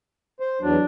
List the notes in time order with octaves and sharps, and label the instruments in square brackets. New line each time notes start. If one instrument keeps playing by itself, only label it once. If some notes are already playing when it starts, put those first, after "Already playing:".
[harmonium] C5
[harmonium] E2 F#3 [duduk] D4